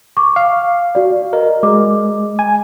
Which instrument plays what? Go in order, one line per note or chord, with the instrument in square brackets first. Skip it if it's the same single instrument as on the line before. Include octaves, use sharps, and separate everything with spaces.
[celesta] C#6 D6
[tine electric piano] F5
[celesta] F#4 D5
[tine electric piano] A#4 [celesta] D#5
[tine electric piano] G#3 [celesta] D6
[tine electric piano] G#5